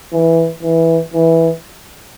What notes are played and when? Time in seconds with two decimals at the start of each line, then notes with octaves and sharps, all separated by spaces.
0.13 E3
0.63 E3
1.14 E3